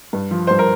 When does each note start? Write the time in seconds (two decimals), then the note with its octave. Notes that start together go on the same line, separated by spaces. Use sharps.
0.13 G2
0.31 F3
0.47 G2 C5
0.59 A#4